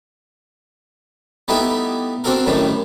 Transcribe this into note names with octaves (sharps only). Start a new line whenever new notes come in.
G3 A3 B3 D#4 E4 G4
C4 D4 F#4 A4 A#4
F#2 A2 D#3 G3 A3